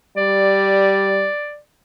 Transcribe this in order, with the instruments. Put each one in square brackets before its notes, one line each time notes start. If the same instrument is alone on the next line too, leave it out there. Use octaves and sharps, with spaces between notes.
[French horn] G3 [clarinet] D5